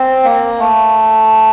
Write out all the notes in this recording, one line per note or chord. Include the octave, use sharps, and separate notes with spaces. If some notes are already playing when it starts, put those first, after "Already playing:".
Already playing: C4
A#3
A3